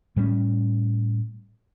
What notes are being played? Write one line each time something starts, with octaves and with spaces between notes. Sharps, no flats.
A2 G3 G#3 C#4